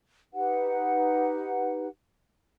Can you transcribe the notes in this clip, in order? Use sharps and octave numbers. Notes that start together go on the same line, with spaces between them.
D#4 G4 B4 F#5